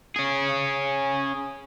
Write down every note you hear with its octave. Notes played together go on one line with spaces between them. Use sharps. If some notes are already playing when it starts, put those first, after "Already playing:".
C#4 G#4